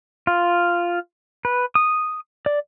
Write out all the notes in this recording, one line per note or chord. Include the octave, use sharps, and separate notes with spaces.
F4
B4
D#6
D5